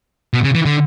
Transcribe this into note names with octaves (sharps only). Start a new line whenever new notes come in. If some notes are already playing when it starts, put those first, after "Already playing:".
B2
C#3
E3
D3